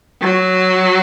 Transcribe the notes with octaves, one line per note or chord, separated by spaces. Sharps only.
F#3